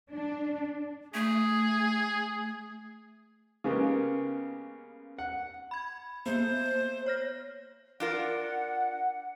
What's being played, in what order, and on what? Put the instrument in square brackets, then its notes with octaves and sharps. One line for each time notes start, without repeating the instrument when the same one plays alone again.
[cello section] D4
[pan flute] A3 [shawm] G#4
[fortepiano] C#3 G#3 A#3 B3 G4
F#5
[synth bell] B5 G#6
[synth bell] A#3 B3 [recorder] C5
[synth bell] C#5 F6 A#6
[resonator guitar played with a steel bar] D4 F4 A#4 [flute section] F#5